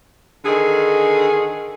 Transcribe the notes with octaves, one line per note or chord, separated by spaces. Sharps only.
D3 D#3 G#4